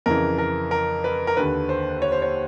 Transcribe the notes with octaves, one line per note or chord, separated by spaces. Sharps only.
F2 C#3 E3 A#4
A#4
A#4
B4
A#4
D#2 D3 B4
C5
C#5
C5
C#5